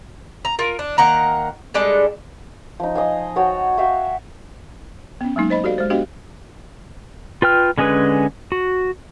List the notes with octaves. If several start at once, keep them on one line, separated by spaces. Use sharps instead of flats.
A#5
F4 A#4
D4
D#3 A#3 F#5 A#5
G3 G#3 D4 A4
F3 D#4
D#5 F5 G#5
F#4 C#5 G5 A5
F#4 E5 F5 G5
B3 C#4
F#3 G#3 A#3 D#4
C5 D#5 B5
F#4 G4 A4 D5 F5
G#3 C5
B3 D4 F#4 G4 D#5 F5
F4 B4 G5 F6
D3 G#3 C#4 G#4 B4
F#4